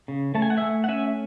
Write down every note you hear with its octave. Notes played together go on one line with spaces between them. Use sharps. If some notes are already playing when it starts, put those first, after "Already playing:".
C#3
A3 A5
G#5
F#5
E5 G#5
A3
F#5
C#4 E5 G#5